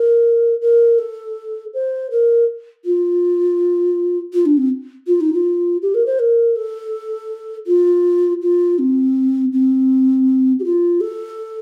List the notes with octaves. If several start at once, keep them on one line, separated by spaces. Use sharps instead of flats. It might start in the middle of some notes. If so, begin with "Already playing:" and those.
Already playing: A#4
A#4
A4
C5
A#4
F4
F4
D4
C4
F4
D#4
F4
G4
A#4
C5
A#4
A4
F4
F4
C4
C4
G4
F4
A4